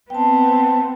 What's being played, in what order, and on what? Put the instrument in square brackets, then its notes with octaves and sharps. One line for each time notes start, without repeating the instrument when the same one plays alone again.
[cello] B3 C4 [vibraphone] G5 A5